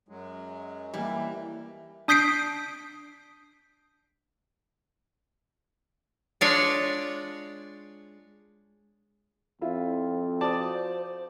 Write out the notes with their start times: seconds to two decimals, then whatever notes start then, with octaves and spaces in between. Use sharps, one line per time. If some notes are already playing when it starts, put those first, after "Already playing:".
0.09 F#2 F#3 G#3
0.94 D3 E3 G3 A#3 D4 E4
2.08 D4 D#6 G6 B6 C7 D7
6.41 G#3 D4 F4 C#5 D5
9.61 F2 E4 F4 E5
10.41 F#4 C5 D5 A5 D#6